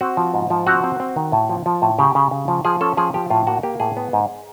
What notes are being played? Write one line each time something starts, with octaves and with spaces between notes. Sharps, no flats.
C4 F#4
F3
G#2
F3
C4 F#4
C4
C4
D#3
A2
F3
F3
A2
C#3 G4
C#3
C#3
F3
F3 G#4
C#4 A4
F3 G#4
F3 G4
A2 F4
A#3 F#4
A#3 G4
A2 G#4
B3
G#2